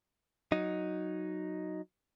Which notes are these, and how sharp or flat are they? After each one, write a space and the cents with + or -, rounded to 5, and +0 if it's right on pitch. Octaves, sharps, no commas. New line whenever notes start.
F#3 +0 D#4 +0